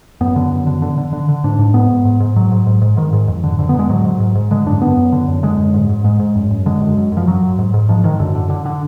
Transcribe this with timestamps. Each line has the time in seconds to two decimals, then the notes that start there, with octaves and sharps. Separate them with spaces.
0.21 F#2 B3
0.36 D3
0.52 F#2
0.67 D3
0.82 D3
0.98 D3
1.13 D3
1.29 D3
1.44 G#2 D4
1.59 G#2
1.74 G#2 B3
1.90 G#2
2.05 G#2
2.20 G#2
2.36 G#2 F#3
2.52 G#2
2.67 G#2
2.82 G#2
2.97 G#2 D#3
3.13 G#2
3.28 F2
3.44 D3
3.58 F2 D3
3.69 B3
3.74 D3 G#3
3.89 G#2 F#3
4.05 G#2
4.20 G#2
4.35 G#2
4.51 D3 G#3
4.66 F#2 D4
4.82 F#2 B3
4.97 F#2
5.12 D3
5.28 F#2
5.43 D3 G#3
5.58 F#2
5.74 G#2
5.89 G#2
6.04 G#2 G#3
6.20 G#2
6.35 F#2
6.51 F#2
6.66 D3 G#3
6.81 F#2
6.97 F#2
7.12 F#2 F3
7.27 F#2 F#3
7.43 F#2
7.59 G#2
7.74 G#2
7.89 G#2 F3
8.04 G#2 D#3
8.20 F#2 D3
8.35 D3
8.50 D3
8.65 D3